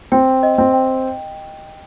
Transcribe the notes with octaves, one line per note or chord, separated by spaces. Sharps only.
C4 G5
D#5
C4
G5